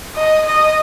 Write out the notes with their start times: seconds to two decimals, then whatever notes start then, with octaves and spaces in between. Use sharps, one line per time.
0.16 D#5
0.46 D#5